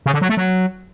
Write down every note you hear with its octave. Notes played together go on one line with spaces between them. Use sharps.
C#3
D3
F#3
A3
F#3